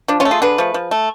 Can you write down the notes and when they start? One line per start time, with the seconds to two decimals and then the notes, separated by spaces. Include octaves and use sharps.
0.08 F3 D4
0.20 C#4 F4
0.25 A3
0.31 F4 G#4
0.42 D3 G#4 B4
0.58 F3 A3
0.74 F3
0.91 A3